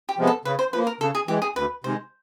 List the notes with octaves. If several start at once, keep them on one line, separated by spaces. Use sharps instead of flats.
G4
C3 F3 G#3 B3
A4
C#3 B4
C5
F3 A#3 B4
A#4
C#3 A4
G#4
E3 G#3 G4
G#4
D2 B4
C3 D#3 G#3 C5